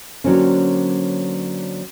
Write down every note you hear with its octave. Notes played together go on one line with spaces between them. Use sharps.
D3 F#3 A#3 C4 C#4